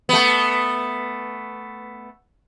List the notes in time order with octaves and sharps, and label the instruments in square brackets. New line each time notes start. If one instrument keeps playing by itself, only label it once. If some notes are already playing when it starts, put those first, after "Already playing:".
[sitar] A3 B3